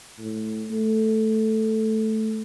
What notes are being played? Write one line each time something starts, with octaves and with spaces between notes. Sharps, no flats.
A2
A3